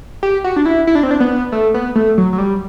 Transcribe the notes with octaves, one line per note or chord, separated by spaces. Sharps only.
G4
F#4
D4
E4
E4
D4
C4
D4
B3
A3
B3
A3
F#3
F#3
G3